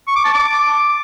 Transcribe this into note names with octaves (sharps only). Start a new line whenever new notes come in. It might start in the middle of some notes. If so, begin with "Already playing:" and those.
C#6
D6
A5
D6